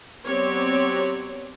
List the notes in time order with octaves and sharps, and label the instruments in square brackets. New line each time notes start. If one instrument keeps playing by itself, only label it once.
[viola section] F#3 B3 C4 G4 C#5 D5